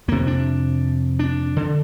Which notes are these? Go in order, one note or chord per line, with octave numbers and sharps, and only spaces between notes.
F2 C3 A#3
D4
D4
D3